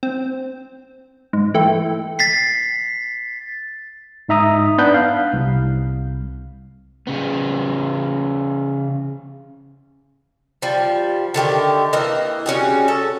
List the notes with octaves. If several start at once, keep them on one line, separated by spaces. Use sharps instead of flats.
C4
G#2
E3 A3 G5
A6 B6 C7
G#2 D#4 E5 A#5 D#6
B3 D4 B5 F#6 G6
F5
C2
C#3 B3
F3 G3
D3 D#3 G4 E5
E3 A#3 A#4 D#5
G3 C#4 F#4 G#4
A4